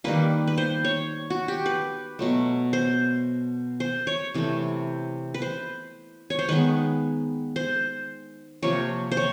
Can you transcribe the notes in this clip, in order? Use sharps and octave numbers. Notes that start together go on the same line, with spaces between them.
D#3 G3 A#3 B4
B4
C5
C#5
F#4
G4
B4
B2 F#3 A3
C5
C5
C#5
C3 E3 A3
B4
C5
C#5
C5
D#3 G#3 B3 B4
C5
C3 F3 A#3 C#5
C5
C#5